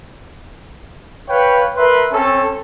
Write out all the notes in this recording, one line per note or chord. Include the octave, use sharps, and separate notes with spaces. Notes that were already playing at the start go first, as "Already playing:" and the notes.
B4 C#5 F5 G5
A#4 B4 E5 C6
C4 C#4 A4